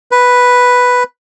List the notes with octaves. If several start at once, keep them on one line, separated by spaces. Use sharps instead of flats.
B4